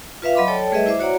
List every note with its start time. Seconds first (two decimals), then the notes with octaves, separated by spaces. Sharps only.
0.22 F4 B4 E5 F5
0.35 F#3 D#5 B5 C6 D6
0.47 A4 C#5 D5 G5 A5
0.71 G3 A3 G#4 B4 D#5 E5
0.86 E4 C5 E5 D6
1.00 F#4 C#5 D5 F#5 A#5